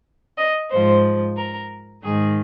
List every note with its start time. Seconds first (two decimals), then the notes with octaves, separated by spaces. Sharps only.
0.36 D#5
0.70 G#2 F3 C5
1.36 A#4
2.03 G#2 D#3 G#4